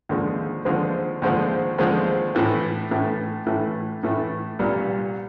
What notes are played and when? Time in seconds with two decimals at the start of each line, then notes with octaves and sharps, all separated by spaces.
0.09 D#2 D3 F3 G#3 C4
0.65 D#2 D3 F3 G#3 C4
1.22 D#2 D3 F3 G#3 C4
1.78 D#2 D3 F3 G#3 C4
2.35 A2 E3 A3
2.91 A2 E3 A3
3.47 A2 E3 A3
4.03 A2 E3 A3
4.59 C2 A#2 G3 B3